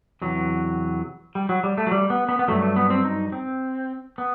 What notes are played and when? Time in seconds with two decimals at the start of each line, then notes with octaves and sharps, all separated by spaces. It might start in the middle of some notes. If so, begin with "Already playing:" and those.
0.22 E2 C3 E3 F#3
1.35 G3
1.49 F#3
1.64 G3
1.78 A3
1.87 F#3
1.92 G3
2.10 B3
2.29 B3
2.39 B3
2.48 G2 F#3 A3
2.62 A3
2.76 B3
2.90 C4
3.05 D#4
3.32 C4
4.18 B3